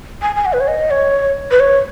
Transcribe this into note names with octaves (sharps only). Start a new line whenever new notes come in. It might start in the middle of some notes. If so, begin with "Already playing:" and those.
G#5
G#5
F#5
B4
C#5
D#5
C#5
B4
C#5